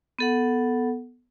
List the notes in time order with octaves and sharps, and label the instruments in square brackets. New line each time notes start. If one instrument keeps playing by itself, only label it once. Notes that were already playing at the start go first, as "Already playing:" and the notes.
[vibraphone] B3 A4 F#5